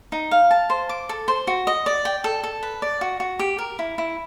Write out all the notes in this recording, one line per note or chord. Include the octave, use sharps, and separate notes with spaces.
D#4
F5
A5
C5
D6
A4
C5
F#4
D#5
D5
G5
A4
A4
B4
D5
F#4
F#4
G4
A#4
E4
E4